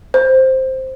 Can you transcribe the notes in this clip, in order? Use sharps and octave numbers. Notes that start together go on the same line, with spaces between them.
C5